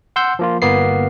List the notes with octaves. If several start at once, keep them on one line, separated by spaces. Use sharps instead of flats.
F#5 C6 E6 G6
F3 A#3 F4
G1 A#3 B3 C7